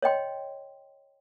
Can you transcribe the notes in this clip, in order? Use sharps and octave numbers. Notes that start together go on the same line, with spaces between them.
C#5 D#5 G5 C6